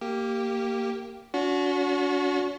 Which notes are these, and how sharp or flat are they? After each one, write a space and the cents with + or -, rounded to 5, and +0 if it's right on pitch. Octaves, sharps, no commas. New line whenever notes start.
A#3 -15 G4 -5
D4 -45 F#4 -15